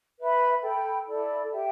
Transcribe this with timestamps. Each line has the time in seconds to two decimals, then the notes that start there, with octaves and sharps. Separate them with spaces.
0.19 B4 E5 B5
0.63 A4 G5 B5
1.07 E4 A4 D5 B5
1.51 G4 E5 G5